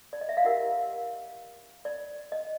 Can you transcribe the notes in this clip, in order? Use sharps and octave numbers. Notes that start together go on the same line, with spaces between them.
D5
D#5
E5
F5
E4 G4 A#4 F#5
D5
D#5